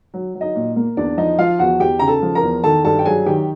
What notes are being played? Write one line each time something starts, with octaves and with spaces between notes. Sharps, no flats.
F#3
F#3
D#4 D#5
A#2
A#3
E2 D4 D5
F3 D#4 D#5
F3 F4 F5
E2 F#4 F#5
E2 G4 G5
C#3 A#5
A4 A5
F3
A#4 A#5
E2
D#3 A4 A5
G2 A4 A5
G5
F#3 G#4 G#5
D#3 G4 G5